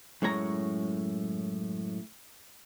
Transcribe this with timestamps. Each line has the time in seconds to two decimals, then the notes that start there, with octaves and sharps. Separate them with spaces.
0.22 F#2 A2 G#3 C#5 A#5